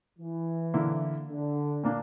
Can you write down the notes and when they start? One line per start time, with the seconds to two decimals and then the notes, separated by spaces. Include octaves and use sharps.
0.19 E3
0.74 D3 A#3 E4
1.29 D3
1.84 A#2 A#3 D4